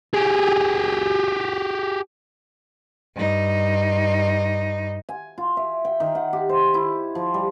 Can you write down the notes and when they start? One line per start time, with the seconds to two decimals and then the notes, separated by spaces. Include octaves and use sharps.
0.14 G4 G#4
3.15 G2 D#4
5.09 G#5
5.38 F4
5.57 E5
5.85 G5
6.00 D#3
6.15 F#5
6.33 G4
6.49 C5
6.74 E4
7.15 F3
7.34 G3